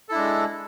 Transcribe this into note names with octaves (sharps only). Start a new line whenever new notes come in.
G#3 D4 E4 A4